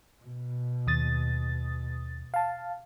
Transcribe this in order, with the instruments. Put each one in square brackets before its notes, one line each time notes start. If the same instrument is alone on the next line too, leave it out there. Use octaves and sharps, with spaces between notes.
[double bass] B2
[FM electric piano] D#2 D#6 A6
F5 A5